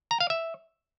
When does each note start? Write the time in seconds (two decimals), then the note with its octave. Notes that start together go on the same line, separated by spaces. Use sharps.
0.11 A#5
0.20 F5
0.30 E5